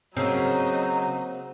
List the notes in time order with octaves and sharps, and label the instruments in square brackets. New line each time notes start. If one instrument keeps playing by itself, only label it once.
[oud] C#3 [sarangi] F#3 [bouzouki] A#3 C4 [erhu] D#4